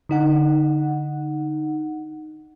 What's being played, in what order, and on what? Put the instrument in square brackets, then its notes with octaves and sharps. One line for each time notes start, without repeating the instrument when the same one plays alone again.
[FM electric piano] D3 D#4 F#5